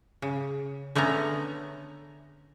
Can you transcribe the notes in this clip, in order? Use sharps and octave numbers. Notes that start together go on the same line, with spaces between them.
C#3
D3 A3 B3 C#4 A#5